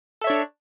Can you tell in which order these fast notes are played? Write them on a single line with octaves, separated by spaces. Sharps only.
A4 E5 C#5 D4